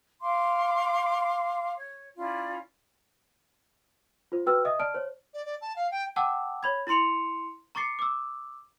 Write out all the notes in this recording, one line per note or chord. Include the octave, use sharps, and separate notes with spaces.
F5 C6 D6
C#5
C#4 E4 F4 D5
F4 C5
F#4 B4 G5 E6 F6
D#5 E5 D#6
D5 A5 F6 D7
C5 C#5
D5
D5
A5
F5
G5
F#5 G5 A5 D6 E6
C#5 B5 G#6
E4 A#5 C6 C#7 F7
A#5 C#6 D6 A6 C7 C#7
D6 E6